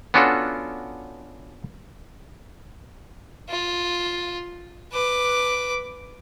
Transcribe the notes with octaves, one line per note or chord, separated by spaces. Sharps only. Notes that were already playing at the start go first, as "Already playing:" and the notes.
B3 C#4 D4 F4 F#4 A4
F4
B4 D6